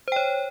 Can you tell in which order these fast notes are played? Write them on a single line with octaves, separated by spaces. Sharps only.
C5 G5 C#5